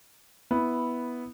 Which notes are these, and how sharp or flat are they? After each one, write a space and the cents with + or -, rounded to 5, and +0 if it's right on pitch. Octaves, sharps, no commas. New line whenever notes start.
B3 +0 E4 -10